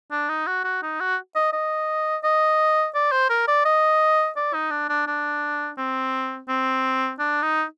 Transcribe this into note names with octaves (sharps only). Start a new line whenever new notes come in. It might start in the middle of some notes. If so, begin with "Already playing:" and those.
D4
D#4
F#4
F#4
D#4
F#4
D#5
D#5
D#5
D5
C5
A#4
D5
D#5
D5
D#4
D4
D4
D4
C4
C4
D4
D#4